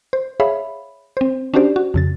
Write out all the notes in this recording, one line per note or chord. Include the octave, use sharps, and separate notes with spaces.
C5
G#4 C#5 E5 F5 B5
C4 C5
C#4 D4 F#4 G4 C5 D5
F#4
F2 C#3 A6